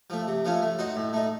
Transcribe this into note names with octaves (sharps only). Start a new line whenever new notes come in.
F3 A3
C3
F3 A3 C#4 F4
A3
D#4 F#4 C5
A2
A3 D#4